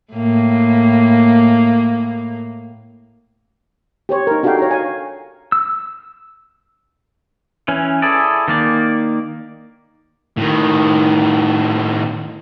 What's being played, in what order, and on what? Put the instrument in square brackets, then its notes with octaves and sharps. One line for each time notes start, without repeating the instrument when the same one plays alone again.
[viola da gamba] A2 A#3
[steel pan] G4 C5 C#5
D#4 A#4
D4 F#4 G4 A4 F5 G5
C#5 A#5
F5 G#5
[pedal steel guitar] E6
E3 C#4
E4 G#4 A4 D5
D#3 A#3 D5
[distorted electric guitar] A2 D#3